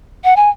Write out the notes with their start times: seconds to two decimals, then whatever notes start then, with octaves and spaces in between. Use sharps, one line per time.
0.24 F#5
0.36 G#5